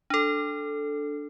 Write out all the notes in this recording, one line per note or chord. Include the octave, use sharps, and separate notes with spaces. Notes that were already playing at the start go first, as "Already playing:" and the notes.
D4 A4